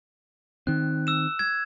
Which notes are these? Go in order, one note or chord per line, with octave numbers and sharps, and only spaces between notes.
D#3 C4 F#6
E6 E7
G#6